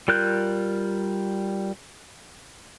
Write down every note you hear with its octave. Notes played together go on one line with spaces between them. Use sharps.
G3 F4 A#4 F#6 G6